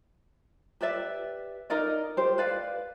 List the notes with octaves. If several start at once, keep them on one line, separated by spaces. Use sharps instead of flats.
G4 B4 D5 E5
D#4 A#4 D5 D#5
G4 C5
B4 D5 F5